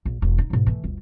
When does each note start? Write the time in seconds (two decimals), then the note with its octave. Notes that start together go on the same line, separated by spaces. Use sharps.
0.05 A#1
0.22 E1
0.38 D#4
0.50 G#2 B2
0.66 E3 A3
0.84 G1 D2